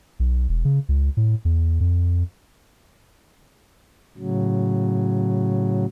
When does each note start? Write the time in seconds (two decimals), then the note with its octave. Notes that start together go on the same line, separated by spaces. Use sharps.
0.20 B1
0.49 E1
0.65 C#3
0.89 C#2
1.17 A2
1.45 E2
1.80 F2
4.18 A2 C#3 F#3